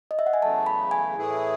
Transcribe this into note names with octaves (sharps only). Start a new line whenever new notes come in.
D#5
E5
F#5
G#5
E2 C#3 F#3 A3 A5
B5
G#5
A2 E3 A3 E4 G#4